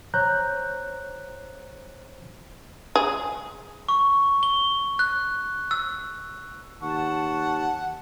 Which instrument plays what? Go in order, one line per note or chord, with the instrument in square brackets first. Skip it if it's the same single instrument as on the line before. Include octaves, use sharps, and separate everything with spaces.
[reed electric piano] C5 C#5 A#5 F#6 G6
[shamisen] G#4
[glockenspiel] C#6
G7
F#6
E6
[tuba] D#2 [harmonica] F#5 [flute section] A5 [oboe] C#6